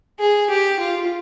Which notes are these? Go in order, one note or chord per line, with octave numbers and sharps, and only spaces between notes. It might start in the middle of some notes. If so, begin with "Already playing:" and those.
G#4
G4
F4